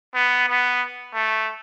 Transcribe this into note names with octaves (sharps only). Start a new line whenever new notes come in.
B3
B3
A3